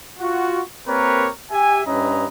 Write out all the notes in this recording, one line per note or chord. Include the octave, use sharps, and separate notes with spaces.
F4 F#4
A#3 C4 G4 A#4 B4 C#5
G4 E5 G#5
G2 C#4 E4 B4 D#5 A#5